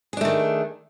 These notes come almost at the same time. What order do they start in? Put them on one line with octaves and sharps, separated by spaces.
G#4 D4 A3 D#3